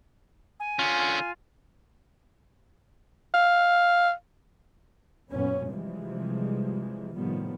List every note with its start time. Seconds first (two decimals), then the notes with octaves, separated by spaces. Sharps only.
0.59 G#5
0.79 D3 C#4 F4
3.34 F5
5.29 F#1 F#2 A#2 B3 C#4
5.68 C3 E3 F3 G3 G#3
7.14 A2 C3 D#3 F3 G3 B3